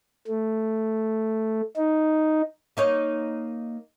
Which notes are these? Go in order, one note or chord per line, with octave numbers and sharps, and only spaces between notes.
A3
D#4
A#3 D#4 C#5